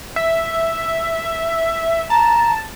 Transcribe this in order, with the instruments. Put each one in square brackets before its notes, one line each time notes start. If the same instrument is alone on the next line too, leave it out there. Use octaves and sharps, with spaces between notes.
[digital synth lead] E5
[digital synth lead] A5 [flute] A#5